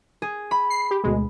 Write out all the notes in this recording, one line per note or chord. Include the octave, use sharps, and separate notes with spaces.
G#4
B5
C7
G4
D2 B2 G#3